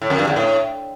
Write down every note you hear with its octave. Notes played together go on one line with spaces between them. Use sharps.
A2
F2
G2
E2
A2